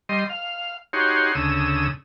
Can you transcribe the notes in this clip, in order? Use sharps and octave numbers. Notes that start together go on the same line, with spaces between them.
G3 D#5 C6
F5
D#4 F#4 G4 C#5 C6
D2 C#3 D#6 E6